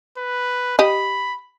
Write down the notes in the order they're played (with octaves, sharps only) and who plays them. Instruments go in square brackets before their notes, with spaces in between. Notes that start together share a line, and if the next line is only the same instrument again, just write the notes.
[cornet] B4
[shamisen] G4 D#5 [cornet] B5